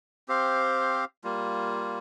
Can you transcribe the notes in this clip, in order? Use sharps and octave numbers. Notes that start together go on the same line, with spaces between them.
C4 G4 C5 F5
G3 A#3 F4